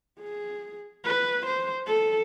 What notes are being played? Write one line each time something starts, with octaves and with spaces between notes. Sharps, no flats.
G#4
B4
C5
A4